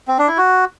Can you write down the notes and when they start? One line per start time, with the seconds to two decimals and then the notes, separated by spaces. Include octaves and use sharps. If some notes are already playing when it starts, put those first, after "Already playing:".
0.08 C4
0.19 D4
0.28 E4
0.38 F#4